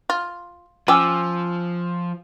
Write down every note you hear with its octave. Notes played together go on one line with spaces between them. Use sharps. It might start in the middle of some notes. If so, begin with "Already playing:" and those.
F4
F3 C#4 G5 G#5 D6 E6